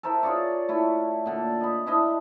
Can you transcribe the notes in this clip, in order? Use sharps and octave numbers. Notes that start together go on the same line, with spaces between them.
A4 A#4 C5 E5
F4 G#4 C#5 D5
A3 E4
A#2 D3
D#5 B5
D4 E4 D#5